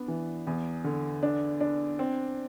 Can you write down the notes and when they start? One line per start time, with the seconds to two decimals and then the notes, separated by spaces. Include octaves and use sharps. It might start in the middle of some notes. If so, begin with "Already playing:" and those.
Already playing: B3 D4
0.08 E3
0.47 E2
0.84 D3
1.23 D4
1.60 D4
1.99 C4